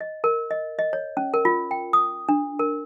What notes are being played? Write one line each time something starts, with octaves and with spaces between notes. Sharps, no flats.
D#5
A#4
D#5
D#5
C#5
C#4
A#4
F4
G5
D#6
D4
A#4